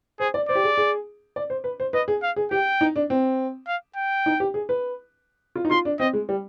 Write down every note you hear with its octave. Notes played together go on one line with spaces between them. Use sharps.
G#4 C5
D5
C5 D5
G4
G#4
G#4
D5
C5
B4
C5
B4 D#5
G#4
F5
G#4
G4 G5
D#4
D4
C4
F5
G5
D#4
G4
G#4
B4
F4
D#4
F4 C6
D4
C4 D#5
G#3
G3